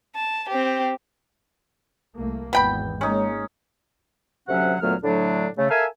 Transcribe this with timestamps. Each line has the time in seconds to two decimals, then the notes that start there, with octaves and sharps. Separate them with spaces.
0.16 A5
0.49 C4 G4
2.16 C2 A3 A#3
2.53 G#1 E2 B3 G5 B5
3.01 G#3 A#3 C#4 D#4
4.48 D2 C3 F#3 C#4 E5 F#5
4.81 D2 A#2 F#3 A3 B3 F6
5.04 A2 D3 F#3 A3 D4
5.57 C#3 A3
5.70 A4 A#4 E5 F5 G#5